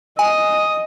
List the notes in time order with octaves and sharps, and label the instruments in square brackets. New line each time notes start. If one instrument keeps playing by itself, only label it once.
[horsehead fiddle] D#5 [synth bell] G#5 [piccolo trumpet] D#6